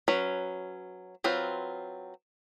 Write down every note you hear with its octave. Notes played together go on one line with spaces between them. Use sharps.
F#3 C#4 B4
F#3 C4 F4 B4